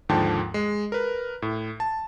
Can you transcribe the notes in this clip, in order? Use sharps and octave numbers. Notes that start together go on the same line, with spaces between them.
D#2 G#2 D3 F3 G5 A5
G#3
A#4 B4
A2
A5